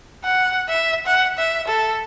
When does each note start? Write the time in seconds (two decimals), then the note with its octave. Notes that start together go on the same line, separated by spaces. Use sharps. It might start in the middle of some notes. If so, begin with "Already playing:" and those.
0.25 F#5
0.69 E5
1.06 F#5
1.38 E5
1.68 A4